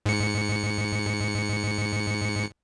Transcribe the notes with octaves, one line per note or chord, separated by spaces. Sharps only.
G#2 C#7